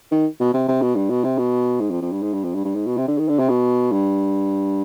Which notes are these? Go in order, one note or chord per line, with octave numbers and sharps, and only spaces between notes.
D#3
B2
C3
C3
B2
G2
B2
C3
B2
G#2
F2
F2
G2
G#2
G2
F2
G2
G2
G#2
B2
C3
D3
D#3
D3
C3
B2
G2